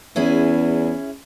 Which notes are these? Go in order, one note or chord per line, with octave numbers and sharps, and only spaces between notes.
E2 C#4 E4 G#4